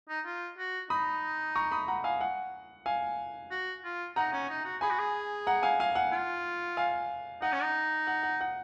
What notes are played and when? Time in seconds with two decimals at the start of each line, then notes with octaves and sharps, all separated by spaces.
0.09 D#4
0.26 F4
0.58 F#4
0.90 D#4 B5 D#6
1.56 A#5 C#6
1.72 B5 D#6
1.88 F#5 A#5
2.04 F5 G#5
2.21 F#5
2.86 F5 G#5
3.51 F#4
3.84 F4
4.16 D#4 F#5 A#5
4.33 C#4
4.49 D#4
4.65 F#4
4.81 G#4 G#5 B5
4.90 F#4
4.98 G#4
5.47 F#5 A#5
5.63 F5 G#5
5.80 F5 G#5
5.95 F#5
6.12 F4
6.77 F5 G#5
7.42 D#4 F#5
7.52 C#4
7.62 D#4
8.07 F#5
8.23 F#5
8.41 F#5